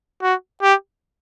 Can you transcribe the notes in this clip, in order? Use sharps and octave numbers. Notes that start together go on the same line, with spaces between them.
F#4
G4